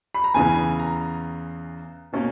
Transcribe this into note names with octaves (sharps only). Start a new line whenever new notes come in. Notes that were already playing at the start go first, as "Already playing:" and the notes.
B5
A#5
E2 C#3 E3 G#5
A#5
B2 A#3 C#4